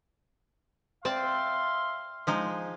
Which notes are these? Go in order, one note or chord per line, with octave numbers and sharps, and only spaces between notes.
C4 D5 E5 F5 A5 C6
F3 G#3 D#4